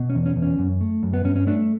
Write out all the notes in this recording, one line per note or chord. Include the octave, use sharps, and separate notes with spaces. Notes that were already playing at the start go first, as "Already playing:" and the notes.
Already playing: B2
C#4
E2
C#4
E2
C#4
F#2
A3
F#2
B3
G2 C#4
C#4
A3 D4